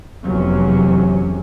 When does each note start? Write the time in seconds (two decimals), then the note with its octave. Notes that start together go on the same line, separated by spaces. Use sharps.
0.23 F1 E2 C3 F#3 C#4